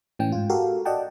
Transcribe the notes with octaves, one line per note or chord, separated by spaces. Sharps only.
A2 E3 C#4 G5
G#2 F4
F#4 G4 A4 A#4 F5
F#4 D5 D#5 F#5 G5 A5